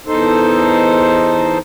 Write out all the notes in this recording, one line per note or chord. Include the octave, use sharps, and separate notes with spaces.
E2 D#4 A4 C5